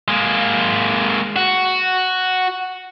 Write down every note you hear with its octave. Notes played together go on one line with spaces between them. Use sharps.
G#3 A#3
F#4